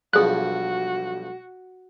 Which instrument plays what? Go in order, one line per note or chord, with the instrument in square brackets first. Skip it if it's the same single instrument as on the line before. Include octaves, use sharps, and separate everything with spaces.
[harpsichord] B1 G2 F3 [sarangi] F#4 [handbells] G#4 F#6